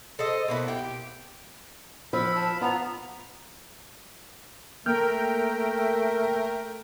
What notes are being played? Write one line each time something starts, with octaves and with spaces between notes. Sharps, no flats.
A4 C5 D#5
B2 A#3 E4
G4
F3 B5 E6
A5
B3 F4 A#5
A3 A#3 A#4 G5 F6 G6